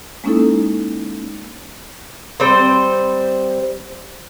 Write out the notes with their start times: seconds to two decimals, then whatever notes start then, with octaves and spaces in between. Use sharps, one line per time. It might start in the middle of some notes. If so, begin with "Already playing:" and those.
0.24 G#3 A#3 C#4 D#4 E4 A4
2.40 G3 C4 C5